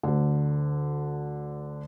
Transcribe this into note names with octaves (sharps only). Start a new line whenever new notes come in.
D2 D3